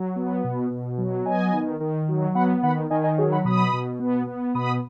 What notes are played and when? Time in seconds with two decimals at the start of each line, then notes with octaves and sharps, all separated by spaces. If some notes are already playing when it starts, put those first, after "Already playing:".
Already playing: F#3
0.16 B3
0.44 B2
0.70 B2
0.98 F#3
1.26 B3 D#5 G#5
1.53 D#3
1.80 D#3
2.08 F#3
2.35 B3 F#5 B5
2.63 D#3 F#5 B5
2.90 D#3 D#5 G#5
3.04 D#5 G#5
3.18 F#3 G#4 C#5
3.32 F#5 B5
3.45 B2 B5 D#6
3.73 B2
3.99 B3
4.27 B3
4.54 B2 B5 D#6